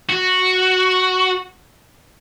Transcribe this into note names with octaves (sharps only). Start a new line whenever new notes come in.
F#4